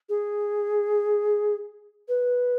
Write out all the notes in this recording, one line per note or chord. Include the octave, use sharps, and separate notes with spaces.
G#4
B4